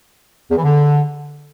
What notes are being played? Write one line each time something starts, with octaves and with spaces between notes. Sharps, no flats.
E2
E3
D3